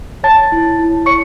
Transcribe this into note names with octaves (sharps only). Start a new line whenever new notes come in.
C#5 A5 A6
E4
E4
C#5 C#6 C#7